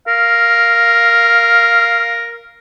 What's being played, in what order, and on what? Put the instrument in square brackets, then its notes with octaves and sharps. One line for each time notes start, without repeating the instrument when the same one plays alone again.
[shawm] A#4 [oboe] F5